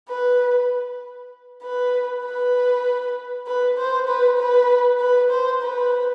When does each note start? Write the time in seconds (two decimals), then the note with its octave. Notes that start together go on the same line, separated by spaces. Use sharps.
0.09 B4
1.63 B4
2.25 B4
3.47 B4
3.78 C5
4.08 B4
4.38 B4
5.00 B4
5.30 C5
5.62 B4